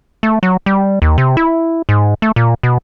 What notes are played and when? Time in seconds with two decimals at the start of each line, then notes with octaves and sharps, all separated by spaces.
0.23 A3
0.43 F#3
0.66 G3
1.02 D#2
1.18 C3
1.37 E4
1.89 G#2
2.22 A3
2.36 A#2
2.63 B2